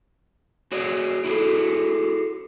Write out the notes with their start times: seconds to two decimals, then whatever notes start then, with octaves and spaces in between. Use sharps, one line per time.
0.72 F#4 G#4 C#5 D5
1.24 E4 F#4 G#4 A4